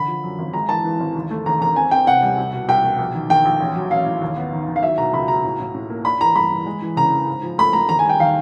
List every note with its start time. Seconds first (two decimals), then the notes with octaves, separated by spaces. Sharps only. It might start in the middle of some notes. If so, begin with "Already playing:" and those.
Already playing: D3 B5
0.08 F3
0.24 F#2
0.39 G#1
0.53 G#3 A#5
0.69 E3 A5
0.85 E3
1.00 G#1
1.15 D#2
1.31 A3
1.46 D#2 A#5
1.61 D#2 A#5
1.76 C4 G#5
1.91 C4 G5
2.07 C3 F#5
2.22 G3
2.38 C2
2.53 B2
2.69 C2 G5
2.84 B2
2.99 A#1
3.14 D#3
3.29 D#3 G5
3.45 A#1
3.60 A1
3.76 F#3
3.91 A1 F5
4.06 A2
4.22 D#2
4.37 B3
4.52 D#3
4.68 D#3
4.76 F5
4.83 F#3 E5
4.98 B2 A#5
5.14 C#2 B5
5.28 B2 A#5
5.44 A2
5.60 A2
5.74 A2
5.90 A#3
6.05 D4 B5
6.21 E3 A#5
6.36 G2 B5
6.52 E3
6.67 G#3
6.82 E3
6.97 C#3 A#5
7.12 E3
7.27 G#2
7.43 F3
7.58 A3 B5
7.73 A3 A#5
7.89 D#2 A#5
7.99 G#5
8.04 G3
8.09 G5
8.20 D#3 F5